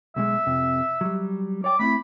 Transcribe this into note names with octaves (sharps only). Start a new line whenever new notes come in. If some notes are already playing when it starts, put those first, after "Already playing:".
B1 B2 G#3 E5
F2 C3
F#3 G3
C#5 D5 G5 D6
A3 C4 E4 B5